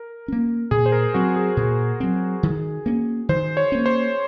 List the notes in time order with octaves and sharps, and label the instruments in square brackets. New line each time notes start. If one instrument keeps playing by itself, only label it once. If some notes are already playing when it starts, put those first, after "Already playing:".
Already playing: [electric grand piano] A#4
[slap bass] A#3 C#4
[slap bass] A#2 [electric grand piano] G#4
[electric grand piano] C5
A#4
[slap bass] F#3 C4 [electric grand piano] F#4
[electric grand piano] G#4
[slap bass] A#2 [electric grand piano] G#4
[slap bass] F#3 C4
D#3
A#3 C#4
[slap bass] D#3 [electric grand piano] C5
[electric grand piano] C#5
[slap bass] A#3 C#4
[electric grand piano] C5